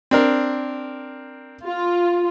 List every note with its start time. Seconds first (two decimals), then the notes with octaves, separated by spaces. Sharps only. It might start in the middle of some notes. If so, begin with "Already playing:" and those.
0.11 C4 D4 A#4
1.65 F4